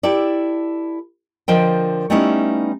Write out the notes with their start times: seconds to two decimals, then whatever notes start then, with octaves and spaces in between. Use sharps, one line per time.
0.03 E4 G4 A4 D5
1.48 D3 F3 A#4 C5 D#5 G5
2.10 G3 A3 B3 C#4 D#4 E4